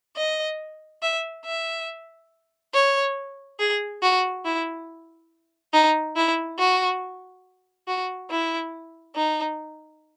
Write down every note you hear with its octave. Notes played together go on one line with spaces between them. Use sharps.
D#5
E5
E5
C#5
G#4
F#4
E4
D#4
E4
F#4
F#4
E4
D#4